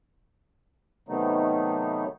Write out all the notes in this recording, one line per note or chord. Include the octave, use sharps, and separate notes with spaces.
C3 D#3 F#3 A3 B3 D#4